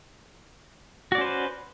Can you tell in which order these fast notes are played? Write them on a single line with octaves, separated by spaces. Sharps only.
F#4 D5 C#4 C5 B4